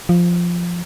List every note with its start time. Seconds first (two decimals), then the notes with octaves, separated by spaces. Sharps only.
0.09 F3